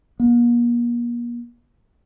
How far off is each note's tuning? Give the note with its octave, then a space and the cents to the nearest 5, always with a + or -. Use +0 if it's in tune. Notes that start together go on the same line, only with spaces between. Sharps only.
A#3 +40